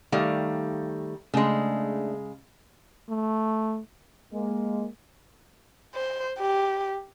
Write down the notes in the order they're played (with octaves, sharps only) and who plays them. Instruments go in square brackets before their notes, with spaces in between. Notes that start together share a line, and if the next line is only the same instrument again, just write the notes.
[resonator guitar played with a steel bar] D#3 G3 A3 [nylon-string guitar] F5
[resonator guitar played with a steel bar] C#3 G#3 [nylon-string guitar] A3 D4
[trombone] A3
[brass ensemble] G#3 A#3
[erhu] C5
G4